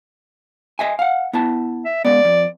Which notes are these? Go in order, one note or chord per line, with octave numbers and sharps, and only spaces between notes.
D#5 E5 G#5
F5 F#5
B3 E4 A5
E5
G#3 B3 D5
F2